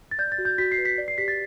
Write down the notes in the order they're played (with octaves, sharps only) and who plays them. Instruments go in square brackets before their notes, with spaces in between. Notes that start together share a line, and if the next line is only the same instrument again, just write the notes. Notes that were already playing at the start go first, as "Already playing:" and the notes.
[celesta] A6
D5 G6
A6
F#4
G6
F#4 B6
C7
B4
B6
D5
C7
G4 B6
A6